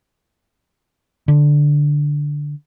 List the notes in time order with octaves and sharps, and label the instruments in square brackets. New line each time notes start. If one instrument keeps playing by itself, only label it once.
[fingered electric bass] D3